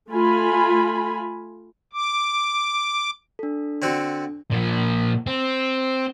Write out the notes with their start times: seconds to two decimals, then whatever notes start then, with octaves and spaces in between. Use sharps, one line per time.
0.11 A3 F4 G#5 B5
1.93 D6
3.39 D4 A4
3.82 D3 C4 F#4
4.52 A#2 F3
5.27 C4